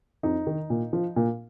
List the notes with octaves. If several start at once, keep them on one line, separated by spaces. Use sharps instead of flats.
F2 D#4
D#3
A#2
F3
A#2